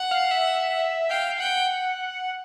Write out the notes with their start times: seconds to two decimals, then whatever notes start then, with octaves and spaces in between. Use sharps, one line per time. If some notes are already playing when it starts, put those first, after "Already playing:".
Already playing: F#5
0.11 F5
0.31 E5
1.10 F5 G5
1.40 F#5 G5